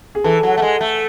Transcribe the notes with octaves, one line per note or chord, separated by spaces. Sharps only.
G#4
E3 A4
F#3
A3
G#3
A3